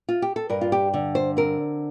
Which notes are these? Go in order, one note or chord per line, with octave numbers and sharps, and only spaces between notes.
F4
G4
A4
G2 A#4
F4
G4
D3
C5
C4 A#4